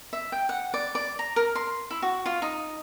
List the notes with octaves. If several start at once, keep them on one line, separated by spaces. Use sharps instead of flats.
E5
G5
F#5
D5
D5
A#5
A#4
C6
E4
F#4
F4
D#4